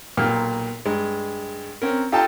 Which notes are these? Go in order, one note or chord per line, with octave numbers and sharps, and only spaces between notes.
B1 A#2 G4 F6
G2 G#3
C4 C#4 A#4
F4 G4 A4 D#5 G5 A5